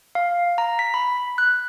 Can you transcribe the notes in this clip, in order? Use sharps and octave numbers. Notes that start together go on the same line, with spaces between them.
F5
A#5
B6
B5
F#6